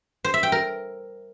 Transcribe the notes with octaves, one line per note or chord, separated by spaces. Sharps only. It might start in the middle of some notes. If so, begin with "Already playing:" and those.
C5
E5
G5
A#4